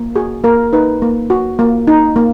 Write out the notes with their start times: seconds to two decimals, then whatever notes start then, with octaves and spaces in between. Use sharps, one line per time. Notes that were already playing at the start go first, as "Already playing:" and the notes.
Already playing: A#3
0.16 F#4 G#4
0.44 A#3 A#4
0.73 D#4 B4
1.02 A#3
1.30 F#4
1.59 A#3
1.87 D#4
2.16 A#3